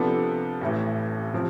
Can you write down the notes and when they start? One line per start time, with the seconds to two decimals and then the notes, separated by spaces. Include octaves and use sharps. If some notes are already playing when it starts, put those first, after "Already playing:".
Already playing: C3 F3 B3 D4 A4
0.61 A1 A2 E3
1.33 C3 F3 C4